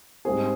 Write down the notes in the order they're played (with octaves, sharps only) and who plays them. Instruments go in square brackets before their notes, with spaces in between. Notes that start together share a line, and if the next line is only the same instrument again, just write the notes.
[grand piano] G#2 G3 C4 G#4